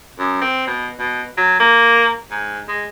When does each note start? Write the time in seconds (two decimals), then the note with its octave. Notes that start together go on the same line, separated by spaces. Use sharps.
0.19 F#2
0.41 C4
0.67 B2
0.99 B2
1.37 F#3
1.60 A#3
2.31 G#2
2.68 G#3